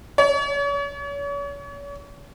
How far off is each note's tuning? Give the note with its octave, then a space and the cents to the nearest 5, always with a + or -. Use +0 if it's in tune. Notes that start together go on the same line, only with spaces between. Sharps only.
C#5 +40